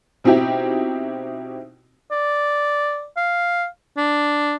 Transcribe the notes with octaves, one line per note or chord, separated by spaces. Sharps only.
B2 C4 D#4 E4 G4
D5
F5
D4